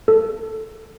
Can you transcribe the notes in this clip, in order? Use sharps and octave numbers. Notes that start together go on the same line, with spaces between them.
A4